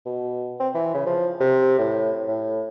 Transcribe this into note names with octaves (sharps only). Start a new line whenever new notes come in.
B2
C4
E3
C#3
F3
C3
A2
A2